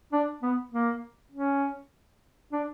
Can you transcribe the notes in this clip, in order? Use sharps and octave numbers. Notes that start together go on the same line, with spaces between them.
D4
B3
A#3
C#4
D4